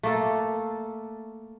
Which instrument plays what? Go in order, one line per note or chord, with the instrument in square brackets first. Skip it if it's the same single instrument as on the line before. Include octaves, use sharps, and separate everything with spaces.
[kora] A3 A#3 A4